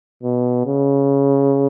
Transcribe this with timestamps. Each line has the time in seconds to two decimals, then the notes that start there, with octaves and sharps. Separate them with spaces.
0.23 B2
0.66 C#3